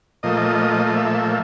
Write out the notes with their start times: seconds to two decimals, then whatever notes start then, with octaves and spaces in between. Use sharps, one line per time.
0.23 A#2 F3 A3 D#5
0.86 D#5
0.95 E5